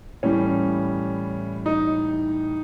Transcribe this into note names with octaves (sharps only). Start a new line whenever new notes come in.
A2 E3 G3 C#4
D#4